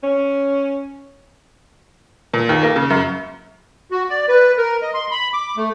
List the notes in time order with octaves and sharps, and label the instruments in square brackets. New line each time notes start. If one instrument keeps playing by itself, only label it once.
[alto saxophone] C#4
[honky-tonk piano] A#2
D#2
A#3
C#3
F#2
[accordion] F#4
D5
B4
A#4
D#5
C6
B5
D6
A3